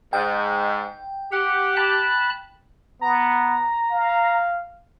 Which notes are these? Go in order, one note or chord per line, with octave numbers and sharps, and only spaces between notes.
G#2 G5
G4 F#5
A5 B5 F#6
B3 A#5
F5